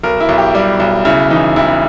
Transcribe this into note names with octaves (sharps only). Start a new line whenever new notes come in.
B1 A#4
E4
B1
G4
G3
B1
C#3 E4
E3 D#4
E1 E4